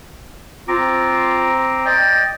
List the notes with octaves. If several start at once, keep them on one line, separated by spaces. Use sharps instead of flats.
C4 F4 A#5 D6
D5 D#5 G5